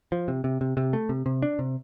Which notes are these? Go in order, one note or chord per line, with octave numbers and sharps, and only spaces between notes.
F3
C3
C3
C3
C3
A3
C3
C3
D4
C3